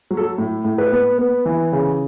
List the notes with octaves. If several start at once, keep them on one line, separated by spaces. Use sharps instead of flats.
F#3
A4
A2
A2
B4
B3
B3
E3
C#3